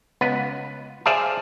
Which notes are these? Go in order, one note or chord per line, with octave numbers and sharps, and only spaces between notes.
C#2 B3 B4
G#4 C5 D5 E5 F5 A5